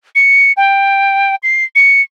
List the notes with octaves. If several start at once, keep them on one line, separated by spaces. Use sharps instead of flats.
C#7
G5
C7
C#7